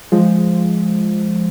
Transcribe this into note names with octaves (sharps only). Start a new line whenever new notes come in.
F3 G#3